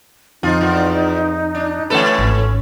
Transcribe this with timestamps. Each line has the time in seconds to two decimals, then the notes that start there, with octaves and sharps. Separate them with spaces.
0.43 F2 F3 D#4 F4
0.61 E2 F4
1.55 D4
1.90 E3 A3 C#4 A4 B4
2.19 G#1